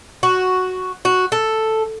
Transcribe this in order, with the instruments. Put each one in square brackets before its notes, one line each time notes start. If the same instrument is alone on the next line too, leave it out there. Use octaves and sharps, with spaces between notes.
[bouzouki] F#4
F#4
A4